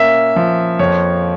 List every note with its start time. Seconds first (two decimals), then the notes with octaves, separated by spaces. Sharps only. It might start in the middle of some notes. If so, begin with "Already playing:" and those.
Already playing: A#2 A#3 C#4 E5
0.36 F3
0.79 F2 C#5